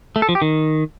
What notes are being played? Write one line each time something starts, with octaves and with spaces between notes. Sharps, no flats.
A3
A4
F3
G4
D#3